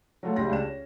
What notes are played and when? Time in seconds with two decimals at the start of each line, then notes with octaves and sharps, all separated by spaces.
0.23 F#3 A3 F4 F#4 A4 C#5
0.36 B1 C#3 G3 G5 C6 A#6
0.49 C#2 D4 G4 E7
0.63 C#4